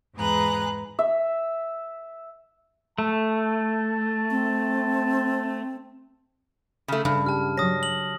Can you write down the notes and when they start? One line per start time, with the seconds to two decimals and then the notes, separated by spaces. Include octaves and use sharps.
0.16 E2 G#2 G#4 B4 A#5 F#6
0.99 E5
2.98 A3 A5
4.31 C4
6.88 C#3 A3
7.05 G2 C#3
7.26 G4 A5 F6
7.58 F#3 C#5 D#6 A#6
7.83 F#7